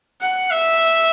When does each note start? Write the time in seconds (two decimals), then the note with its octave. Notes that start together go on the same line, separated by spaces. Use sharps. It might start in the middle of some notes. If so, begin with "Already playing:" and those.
0.21 F#5
0.51 E5